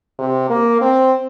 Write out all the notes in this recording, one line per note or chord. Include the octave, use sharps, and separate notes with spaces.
C3
A#3
C4